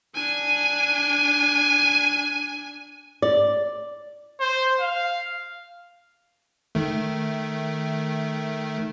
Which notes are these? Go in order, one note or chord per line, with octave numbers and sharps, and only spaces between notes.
D4 G#5
D5
C5
F5
D#3 A3